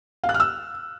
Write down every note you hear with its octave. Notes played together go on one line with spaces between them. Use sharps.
F5
F#6
F6
E6